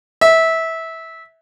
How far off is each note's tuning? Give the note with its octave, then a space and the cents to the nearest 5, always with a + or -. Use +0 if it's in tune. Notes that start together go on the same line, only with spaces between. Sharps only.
E5 -20